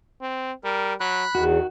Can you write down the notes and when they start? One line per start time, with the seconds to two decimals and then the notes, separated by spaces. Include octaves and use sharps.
0.22 C4
0.64 G3 A#4
1.00 F#3 B5 F#6
1.35 E2 D#3 F#4